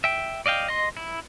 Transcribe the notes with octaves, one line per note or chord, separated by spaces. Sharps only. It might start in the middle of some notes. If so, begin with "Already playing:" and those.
E5 G5
D5 D#5 F5 G5
D#5 C6
E4